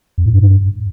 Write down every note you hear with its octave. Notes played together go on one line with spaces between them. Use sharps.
F2
A2
G2